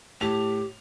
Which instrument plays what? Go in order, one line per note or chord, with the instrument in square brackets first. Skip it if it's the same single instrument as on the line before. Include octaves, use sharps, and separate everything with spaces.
[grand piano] A2 F7 [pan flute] G4